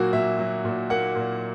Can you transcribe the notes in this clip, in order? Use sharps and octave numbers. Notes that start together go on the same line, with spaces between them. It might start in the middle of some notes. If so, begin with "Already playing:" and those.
Already playing: A#2 F#3 A#3 F#4
A#2 E5
F#3
A#2
A#3 F#5
A#2